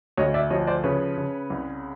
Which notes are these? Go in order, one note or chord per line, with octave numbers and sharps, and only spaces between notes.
D2 C#5 D#5
D5 E5
F3 C#5 D#5
C5 D5
C#3 B4 C#5
C#3
C2